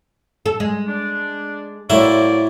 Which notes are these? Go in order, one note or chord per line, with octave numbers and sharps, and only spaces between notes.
A4
G#3
D4
A2 F#3 A#3 E4 C5 D5 E5